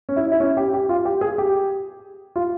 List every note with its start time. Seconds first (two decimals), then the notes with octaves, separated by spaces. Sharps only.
0.09 C#4
0.16 E4
0.32 E4
0.40 C#4
0.57 G4
0.74 G4
0.89 F4
1.05 G4
1.21 G#4
1.38 G4
2.36 F4